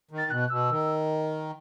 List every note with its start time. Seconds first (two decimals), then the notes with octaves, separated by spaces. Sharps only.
0.11 D#3
0.18 A6
0.30 B2 F#6
0.50 B2 E6
0.70 D#3